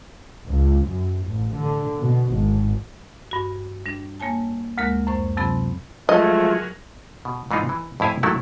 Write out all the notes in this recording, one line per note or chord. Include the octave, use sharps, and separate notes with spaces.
C#2
F#2
A1
D3
B2
G#1
G2 F#4
G3 D4
G3 A#3 C#5 G#5 A5
D2 G#3 A#3 A#4 F#6
F#2 C5 C#6
F2 C3 F#3 C4 B5
F3 F#3 G#3 A3 F4 G#4 A#4 D#5
B2
G#2 E3 D4 D#4 F4
E3
F2 A2 E4 F5 G#5
D#3 F#3 A3 A#3 E4